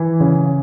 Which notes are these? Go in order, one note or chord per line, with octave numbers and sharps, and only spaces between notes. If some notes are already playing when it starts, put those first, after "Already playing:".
Already playing: E3
C#3